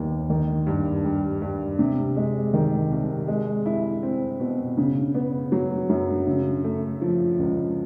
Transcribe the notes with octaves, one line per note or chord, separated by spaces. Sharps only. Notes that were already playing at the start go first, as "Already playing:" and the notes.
Already playing: D#2 G3 B3
D#3
G2
G3
G2
C3
G#3
D#3
C2
G#3
E4
C4
B2
C#3
B3
F#3
F#2
C#3
A3
F3
C#2